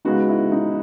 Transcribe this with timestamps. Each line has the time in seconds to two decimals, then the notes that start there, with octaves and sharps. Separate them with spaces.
0.05 C#3 G#3 B3 D#4 F#4
0.29 E4
0.52 D#4